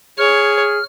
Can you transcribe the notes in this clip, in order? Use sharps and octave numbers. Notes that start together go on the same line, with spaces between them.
G#4 C#5 F6